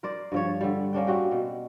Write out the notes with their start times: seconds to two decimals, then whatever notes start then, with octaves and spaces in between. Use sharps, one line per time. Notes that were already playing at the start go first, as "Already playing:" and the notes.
0.03 A#4 C5 D5
0.32 G2 F3 C#5
0.61 D3 G3
0.93 A#3 C#4 D4 G5
1.07 C4 F#4 G4
1.32 B2